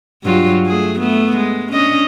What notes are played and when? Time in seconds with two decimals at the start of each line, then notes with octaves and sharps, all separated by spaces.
0.23 G2 F#3 F4
0.67 A3 G#4
1.00 A3 B3
1.36 G#3
1.73 C#4 D4 D#5